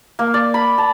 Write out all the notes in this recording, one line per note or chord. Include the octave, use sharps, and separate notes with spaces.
A#3
D5
B5
A5